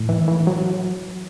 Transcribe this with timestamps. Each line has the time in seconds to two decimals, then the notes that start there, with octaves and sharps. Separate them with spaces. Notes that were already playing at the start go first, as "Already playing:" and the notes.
Already playing: A2
0.09 E3
0.28 E3
0.47 F#3